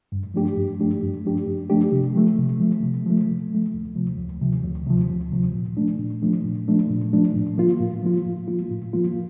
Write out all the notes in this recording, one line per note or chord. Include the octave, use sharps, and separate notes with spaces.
G2
F3 A3 D4 G4
G2
F3 A3 D4 G4
G2
F3 A3 D4 G4
G2
F3 A3 D4 G4
C3
F3 A3
C3
F3 A3
C3
F3 A3
C3
F3 A3
D2
C3 F3
D2
C3 F3
D2
C3 F3
D2
C3 F3
A#2
F3 A3 D4
A#2
F3 A3 D4
A#2
F3 A3 D4
A#2
F3 A3 D4
A2
F3 A#3 F4
A2
F3 A#3 F4
A2
F3 A#3 F4
A2
F3 A#3 F4